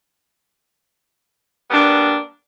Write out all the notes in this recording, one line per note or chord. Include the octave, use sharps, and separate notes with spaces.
G3 A#3 B3 D4